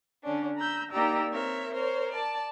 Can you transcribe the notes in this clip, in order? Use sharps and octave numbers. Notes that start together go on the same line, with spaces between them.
D3 C#4 D4
A#5 B5 E6 G6
A#3 D#4 G4 D5 A#5 E6
C4 A#4 C#5 E5
A#4 C5 C#5
D5 A5